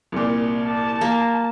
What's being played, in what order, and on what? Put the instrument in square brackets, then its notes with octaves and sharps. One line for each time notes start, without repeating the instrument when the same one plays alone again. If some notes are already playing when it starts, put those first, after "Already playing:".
[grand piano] C2 A#2
[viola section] A5
[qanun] A#3